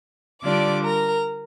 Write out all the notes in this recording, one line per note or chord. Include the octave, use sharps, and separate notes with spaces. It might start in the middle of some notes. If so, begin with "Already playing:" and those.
D3 G3 D4 F4 D5 D6
A#4 A#5